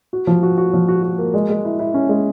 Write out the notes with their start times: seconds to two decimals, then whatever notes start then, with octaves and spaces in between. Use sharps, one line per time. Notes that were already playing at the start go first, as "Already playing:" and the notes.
0.13 F#4
0.27 F3
0.43 F#4
0.58 F#4
0.73 F3
0.88 F#4
1.03 F#4
1.18 A#3
1.34 G#3
1.49 G#3
1.65 E4
1.79 E4
1.94 C#4
2.09 G#3